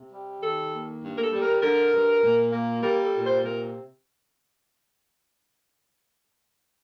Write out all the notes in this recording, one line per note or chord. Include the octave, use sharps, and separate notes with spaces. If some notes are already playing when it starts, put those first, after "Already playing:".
Already playing: C3
G3
D#3 A4
A#3
G2
A#4
A4
G3
A#4
D3 A#4
G2
A#2
A#3
G3 A#4
A4
A#2
C5
C3 A#4